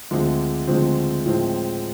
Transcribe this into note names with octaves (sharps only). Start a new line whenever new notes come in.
D2 D3 F3 G#3 C4
D2 D3 F3 G#3 C4
A2 F3 G#3 C4